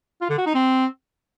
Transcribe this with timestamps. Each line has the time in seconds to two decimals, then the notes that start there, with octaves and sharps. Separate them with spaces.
0.21 F4
0.30 D3
0.38 F#4
0.46 D#4
0.54 C4